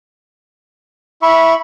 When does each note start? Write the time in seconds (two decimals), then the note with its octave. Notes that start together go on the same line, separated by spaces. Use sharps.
1.22 E4 E5 B5 C#6